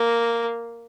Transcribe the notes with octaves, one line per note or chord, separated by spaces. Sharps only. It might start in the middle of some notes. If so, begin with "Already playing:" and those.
Already playing: A#3